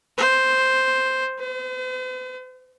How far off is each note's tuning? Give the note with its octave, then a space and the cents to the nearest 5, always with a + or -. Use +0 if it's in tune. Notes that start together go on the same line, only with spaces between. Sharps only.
C5 +0
C5 -45